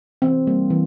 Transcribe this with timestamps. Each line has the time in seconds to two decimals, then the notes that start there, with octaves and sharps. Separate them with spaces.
0.22 E3 C4
0.47 G3 A#3
0.70 E3